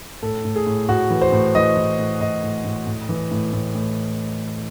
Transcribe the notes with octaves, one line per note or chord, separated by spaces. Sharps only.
A2 A4
A2
G#4
A2
A2 F#4
E3
C5
A2
E3 D#5
E3
A2
A2 D#5
A2
A2
A2
E3
A2
A2
A2